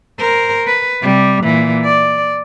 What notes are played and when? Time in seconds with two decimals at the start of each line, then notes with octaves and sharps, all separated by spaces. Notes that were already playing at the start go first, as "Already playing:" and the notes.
0.19 A#4 C5
0.67 B4
1.02 C3 G3
1.44 A#2 E3
1.85 D5